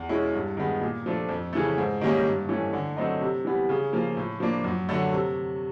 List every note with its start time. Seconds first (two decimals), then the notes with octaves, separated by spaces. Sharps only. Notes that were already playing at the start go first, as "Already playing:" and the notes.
Already playing: E2
0.09 B2 G#3 C#4 E4
0.34 G2
0.57 D#3 G#3 B3
0.81 A#2
1.06 F3 A3 D4
1.29 F2
1.53 C#3 E3 A3
1.78 G#2
2.01 D#3 G3 A#3 C#4
2.26 G2
2.49 E3 A3 C#4
2.73 D3
2.97 F#3 A3 C4 D#4
3.21 C3
3.45 E3 G3 B3
3.69 C#3
3.93 F3 A#3
4.17 A2
4.40 F3 A#3 D4
4.64 F#2
4.89 D3 F#3 A3
5.13 C3